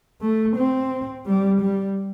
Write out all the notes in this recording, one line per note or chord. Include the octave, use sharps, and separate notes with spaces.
A3
C4
G3
G3